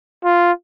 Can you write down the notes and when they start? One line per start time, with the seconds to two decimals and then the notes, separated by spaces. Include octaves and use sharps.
0.24 F4